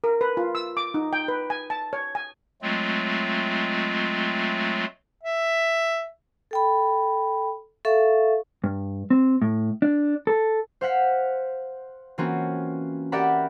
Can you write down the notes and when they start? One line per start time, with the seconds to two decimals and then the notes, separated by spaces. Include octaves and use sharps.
0.04 A#4
0.21 B4
0.37 F4
0.55 E6
0.77 D6
0.94 D#4
1.13 G5
1.28 B4
1.50 G#5
1.70 A5
1.93 C#5
2.15 G#5
2.62 F#3 G#3 A3 C4 F4
5.23 E5
6.51 A4 G5 B5
7.85 A4 E5 F5 C#6
8.64 G2
9.10 C4
9.42 A2
9.82 D4
10.27 A4
10.81 C5 F5 F#5 B6
12.18 E3 A#3 C4 C#4 F4 F#4
13.12 G4 A#4 D5 E5 F#5 B5